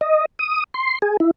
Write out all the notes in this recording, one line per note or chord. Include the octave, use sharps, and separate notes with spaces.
D#5
D#6
C6
G#4
E4